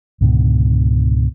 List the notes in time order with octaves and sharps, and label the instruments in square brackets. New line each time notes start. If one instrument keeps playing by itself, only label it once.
[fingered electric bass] C#2 G#2 B2 D3